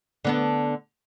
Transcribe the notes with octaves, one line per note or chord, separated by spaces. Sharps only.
D3 B3 D4